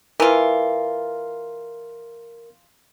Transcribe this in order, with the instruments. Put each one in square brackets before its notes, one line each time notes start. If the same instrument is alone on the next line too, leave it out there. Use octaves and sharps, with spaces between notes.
[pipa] E3 F4 [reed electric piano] A#4